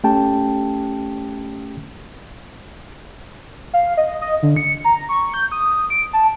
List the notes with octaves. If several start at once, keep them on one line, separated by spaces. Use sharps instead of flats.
A3 C#4 G4 G5 A5
F5
D#5
D#5
D3
C#7
A#5
C#6
G6
D#6
D7
A5